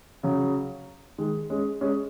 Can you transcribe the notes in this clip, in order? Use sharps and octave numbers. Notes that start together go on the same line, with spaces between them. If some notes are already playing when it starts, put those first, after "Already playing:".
C#3 F#3
D#3 G#3
G#3 C#4
G#3 C#4